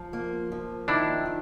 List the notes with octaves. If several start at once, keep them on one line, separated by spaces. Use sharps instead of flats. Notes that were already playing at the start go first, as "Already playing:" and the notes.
Already playing: F3
A#3
F3
D#3 D4 E4
D#3